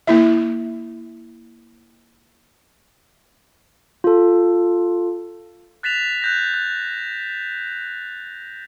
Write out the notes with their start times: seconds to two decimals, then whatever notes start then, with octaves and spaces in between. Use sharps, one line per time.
0.07 A#3 E4 E5
4.04 F4 A4
5.83 F#6 A6 B6 E7 F7
6.22 F#6 G6 A#6
6.54 F#6